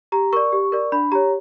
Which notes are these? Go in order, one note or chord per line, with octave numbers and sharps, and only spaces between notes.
G4 A#5
A#4 D5 C#6
G4
A#4 D5
D4 B5
G4 C#5 A#5